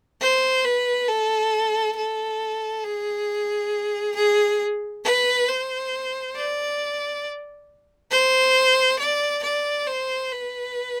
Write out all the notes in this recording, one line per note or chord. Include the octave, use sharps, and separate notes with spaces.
C5
B4
A4
A4
G#4
G#4
B4
C5
D5
C5
D5
D5
C5
B4